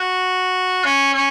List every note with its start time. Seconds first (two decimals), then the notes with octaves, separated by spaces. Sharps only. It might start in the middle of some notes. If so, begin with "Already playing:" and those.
Already playing: F#4
0.85 C#4
1.14 C#4